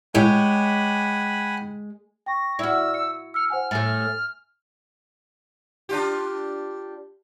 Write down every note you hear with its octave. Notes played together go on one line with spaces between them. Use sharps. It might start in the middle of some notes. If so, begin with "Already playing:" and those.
A2 G#3 G4 C#5 F#5 G#5 B5
G5 C#6 A#6
E4 F#4 D5 E6 F6
C#7
E6 F6 C#7
C5 F#5 G#5 F6
A2 A3 E5 G#5 F6 A6
D4 F4 G4